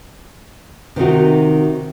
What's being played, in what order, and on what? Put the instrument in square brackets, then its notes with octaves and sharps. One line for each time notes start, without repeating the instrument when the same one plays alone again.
[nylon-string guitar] C3 D#3 D#4 F#4